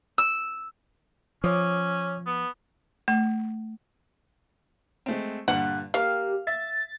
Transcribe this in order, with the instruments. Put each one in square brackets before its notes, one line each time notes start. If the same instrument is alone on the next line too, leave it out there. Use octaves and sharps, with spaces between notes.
[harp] E6
[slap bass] F3 [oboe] C#4 [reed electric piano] C#5 D6 D#6
[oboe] B3
[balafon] A3
[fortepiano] G#3 A3 C4
[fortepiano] G2 A#2 D3 [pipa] F#5
[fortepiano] A#3 [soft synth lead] G4 [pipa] F5
[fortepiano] E5 [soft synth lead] A6